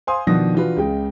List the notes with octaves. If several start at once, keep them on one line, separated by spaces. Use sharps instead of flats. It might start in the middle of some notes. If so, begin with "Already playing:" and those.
C5 F5 G#5 C6 D#6
B2 D#3 F3 D4 D#6 A#6
E3 D4 F4 F#4 B4
C#2 C#3 G#3 G5